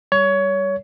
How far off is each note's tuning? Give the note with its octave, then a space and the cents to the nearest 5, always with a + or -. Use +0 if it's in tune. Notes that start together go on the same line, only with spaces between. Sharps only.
G3 +0 C#5 +20